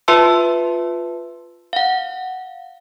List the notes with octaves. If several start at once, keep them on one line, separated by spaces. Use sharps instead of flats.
F4 B4 E5 A5 C6 E6
F5 F#5